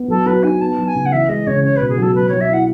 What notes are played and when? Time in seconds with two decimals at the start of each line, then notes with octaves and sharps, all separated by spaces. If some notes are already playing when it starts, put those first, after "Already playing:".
Already playing: B3
0.08 F#3 A4
0.26 F#3 B4
0.43 D#4 G#5
0.61 B3 A5
0.78 F#3
0.86 G#5
0.95 C#3
1.05 F#5
1.12 E3 E5
1.29 G#3 D#5
1.47 C#3 C#5
1.64 C#4 C#5
1.76 B2 B4
1.89 G#4
1.97 F#3 A4
2.15 F#3 B4
2.28 F#3 C#5
2.40 E5
2.50 E4 F#5